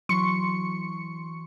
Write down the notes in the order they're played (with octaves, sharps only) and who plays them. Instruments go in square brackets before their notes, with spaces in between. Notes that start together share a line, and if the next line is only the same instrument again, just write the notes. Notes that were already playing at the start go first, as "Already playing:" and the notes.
[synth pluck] E3 F#3 C6 C#6 C#7